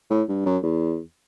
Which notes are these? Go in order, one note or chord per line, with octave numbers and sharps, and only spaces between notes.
A2
G2
F#2
E2